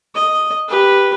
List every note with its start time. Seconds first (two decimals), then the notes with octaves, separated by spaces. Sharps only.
0.15 D#5
0.68 G4 B4